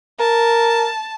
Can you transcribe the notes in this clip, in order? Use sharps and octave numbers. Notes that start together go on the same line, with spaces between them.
A#4 A5